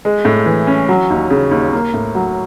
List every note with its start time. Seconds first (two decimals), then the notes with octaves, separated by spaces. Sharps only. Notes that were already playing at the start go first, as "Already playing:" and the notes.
0.05 G#3
0.25 A2
0.46 E3
0.67 C#4
0.89 F#3
1.10 D#2
1.30 C#3
1.51 D#2
1.73 A#3
1.94 A2
2.15 F#3